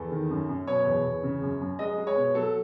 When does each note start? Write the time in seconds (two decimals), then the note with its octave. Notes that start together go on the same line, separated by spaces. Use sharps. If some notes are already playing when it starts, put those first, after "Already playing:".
Already playing: E2 A4
0.11 D#3
0.30 F#2
0.49 F#2
0.67 B2 C#5
0.86 E2
1.04 E2
1.23 C#3
1.42 F#2
1.61 F#2
1.79 G#3 D#5
1.98 G#3
2.07 C#5
2.16 B2
2.35 F#3 A4